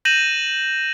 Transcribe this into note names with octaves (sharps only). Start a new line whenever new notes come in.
G6 A#6 D#7 E7 F#7